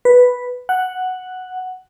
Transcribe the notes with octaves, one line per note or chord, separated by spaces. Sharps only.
B4
F#5